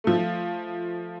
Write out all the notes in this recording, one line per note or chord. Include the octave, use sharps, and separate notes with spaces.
F3 A3